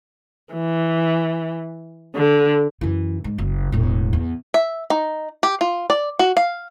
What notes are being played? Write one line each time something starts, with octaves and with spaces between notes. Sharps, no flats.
E3
D3
F#2 E3
G#2
F#1
E1 A2
E2
E5
D#4
G4
F4
D5
F#4
F5